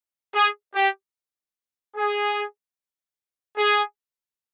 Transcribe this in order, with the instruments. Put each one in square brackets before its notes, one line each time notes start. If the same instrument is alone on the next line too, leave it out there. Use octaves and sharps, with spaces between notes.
[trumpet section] G#4
G4
G#4
G#4